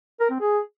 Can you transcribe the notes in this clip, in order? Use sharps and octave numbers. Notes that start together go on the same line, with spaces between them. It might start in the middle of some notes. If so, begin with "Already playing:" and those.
A#4
C4
G#4